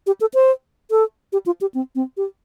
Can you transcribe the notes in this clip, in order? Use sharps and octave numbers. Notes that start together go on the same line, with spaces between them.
G4
A4
C5
A4
G4
F4
G4
C4
C4
G4